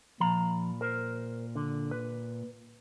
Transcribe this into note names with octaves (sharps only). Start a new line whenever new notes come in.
A#2 F3 A#5 B5
A#4 C5
D3
B4